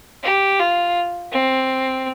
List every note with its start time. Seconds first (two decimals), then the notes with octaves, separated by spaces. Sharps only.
0.23 G4
0.59 F4
1.32 C4